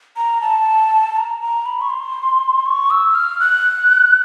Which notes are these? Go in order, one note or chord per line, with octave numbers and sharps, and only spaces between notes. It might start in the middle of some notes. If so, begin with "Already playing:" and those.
A#5
A5
A#5
A#5
B5
C#6
C6
C#6
E6
F6
F#6